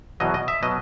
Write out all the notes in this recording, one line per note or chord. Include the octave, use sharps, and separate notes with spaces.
E2 B2 F#3 D#5
D#5
E5
B2 F#3 D#5